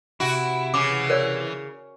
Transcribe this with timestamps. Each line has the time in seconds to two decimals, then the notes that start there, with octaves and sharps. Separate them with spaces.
0.20 C3 E4 F#4 F#5 D7
0.74 C#3 E3 D6
1.10 A#4 C#5 D5